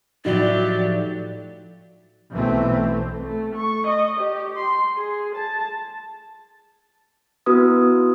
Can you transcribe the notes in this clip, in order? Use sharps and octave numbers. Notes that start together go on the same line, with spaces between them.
A2 F3 F#3 D#4 E4 F#4 G4 D5
B1 E3 A3 C4
A3
C#6
D#5
G4
C6
G#4
A5
B3 E4 F#4 B4 D#6